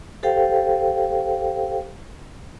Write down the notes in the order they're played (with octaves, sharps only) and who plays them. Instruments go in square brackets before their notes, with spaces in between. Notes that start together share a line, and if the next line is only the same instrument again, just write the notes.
[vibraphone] G4 A4 C5 F5 G5